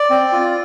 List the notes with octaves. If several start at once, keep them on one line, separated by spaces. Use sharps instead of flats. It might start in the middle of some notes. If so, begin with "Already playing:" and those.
Already playing: D5
C4
F4